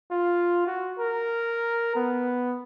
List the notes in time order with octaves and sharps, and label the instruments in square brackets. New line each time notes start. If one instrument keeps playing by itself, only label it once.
[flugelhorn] F4
F#4
A#4
B3